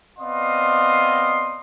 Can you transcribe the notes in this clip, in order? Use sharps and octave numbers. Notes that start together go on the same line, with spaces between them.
B3 C4 D5 D#5 F5 C6